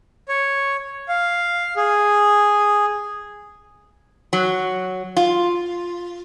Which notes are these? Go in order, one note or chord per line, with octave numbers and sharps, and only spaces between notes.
C#5
F5
G#4
F#3
F4